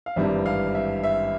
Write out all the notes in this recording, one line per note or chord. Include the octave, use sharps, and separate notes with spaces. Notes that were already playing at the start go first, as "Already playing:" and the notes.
F5
G#1 G2 E3 G3 E5
F5
E5
E5